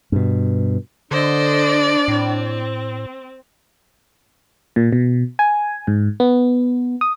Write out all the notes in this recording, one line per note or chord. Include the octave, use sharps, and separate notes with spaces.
G2 B2
D3 D4 C5 D5 D#5
A2 C4
A#2
B2
G#5
G#2
B3
D#6